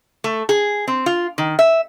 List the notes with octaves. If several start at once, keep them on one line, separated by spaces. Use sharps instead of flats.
A3
G#4
C4
F4
D#3
E5